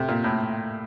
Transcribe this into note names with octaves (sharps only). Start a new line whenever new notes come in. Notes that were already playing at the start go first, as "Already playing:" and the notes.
Already playing: C3 A3
A#2
A2